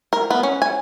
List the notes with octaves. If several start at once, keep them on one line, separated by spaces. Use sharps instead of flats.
A#4
B3
C#4
G#5